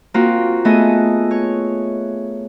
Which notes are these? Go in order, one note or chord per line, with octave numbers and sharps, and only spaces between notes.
A#3 C4 F4 F#4
A3 B3 G#4 A4 D#5
C#5